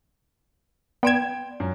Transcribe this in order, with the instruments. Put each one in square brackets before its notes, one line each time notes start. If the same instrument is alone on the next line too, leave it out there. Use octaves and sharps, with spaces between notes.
[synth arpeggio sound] B3 G#6 [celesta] D5 C6 [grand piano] G5 D7 E7
[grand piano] F#2